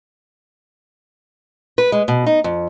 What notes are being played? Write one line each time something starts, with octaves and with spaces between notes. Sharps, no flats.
B4
G#3
B2
D#4
F2